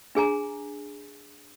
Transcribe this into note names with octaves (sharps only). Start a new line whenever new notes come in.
D4 G#4 G#5 A#5